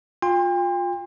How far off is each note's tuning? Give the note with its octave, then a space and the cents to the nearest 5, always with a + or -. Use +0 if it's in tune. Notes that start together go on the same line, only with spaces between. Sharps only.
F4 +20 G5 +40 C6 +0